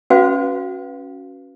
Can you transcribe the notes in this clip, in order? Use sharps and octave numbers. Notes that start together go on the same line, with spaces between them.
C#4 F#4 B4 F5